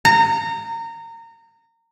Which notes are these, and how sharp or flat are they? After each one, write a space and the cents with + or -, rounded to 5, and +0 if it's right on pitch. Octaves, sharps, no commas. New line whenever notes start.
A#5 -25